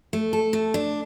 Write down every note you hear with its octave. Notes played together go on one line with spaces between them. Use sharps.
A3
A4
A3
D4